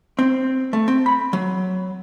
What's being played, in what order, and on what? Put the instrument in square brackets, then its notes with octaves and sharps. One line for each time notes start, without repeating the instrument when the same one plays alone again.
[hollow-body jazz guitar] C4
A3
C4
B5
F#3